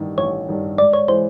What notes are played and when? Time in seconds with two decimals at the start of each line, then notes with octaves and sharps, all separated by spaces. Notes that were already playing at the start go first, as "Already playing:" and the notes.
Already playing: A1 G2 D#3
0.18 A1 C#5
0.48 G2 D#3
0.78 G#2 D5
0.93 C#5
1.08 E3 G#3 C5